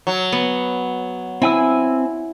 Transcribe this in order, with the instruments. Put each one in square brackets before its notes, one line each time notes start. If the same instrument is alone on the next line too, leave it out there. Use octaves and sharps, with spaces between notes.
[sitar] F#3
[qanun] B3
[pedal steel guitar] C4 G#5 E6 [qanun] E4